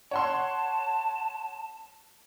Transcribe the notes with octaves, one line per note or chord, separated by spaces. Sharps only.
C#5 F#5 A5 C6